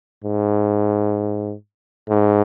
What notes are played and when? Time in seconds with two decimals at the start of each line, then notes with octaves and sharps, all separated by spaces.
0.24 G#2
2.09 G#2